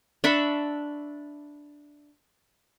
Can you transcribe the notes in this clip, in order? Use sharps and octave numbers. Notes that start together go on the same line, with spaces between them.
D4 E5 B5 C#6